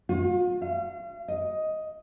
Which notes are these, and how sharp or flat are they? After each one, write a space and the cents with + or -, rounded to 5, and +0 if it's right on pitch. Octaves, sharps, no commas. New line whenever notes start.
F4 +40
F5 -35
D#5 +10